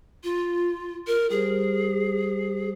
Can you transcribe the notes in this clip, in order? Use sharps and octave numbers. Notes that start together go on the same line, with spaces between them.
F4
A#4
G3 G4 G#4 C5